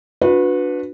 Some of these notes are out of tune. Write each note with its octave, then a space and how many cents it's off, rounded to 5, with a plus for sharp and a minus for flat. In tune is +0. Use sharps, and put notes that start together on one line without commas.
D4 +0 F#4 -35 B4 +0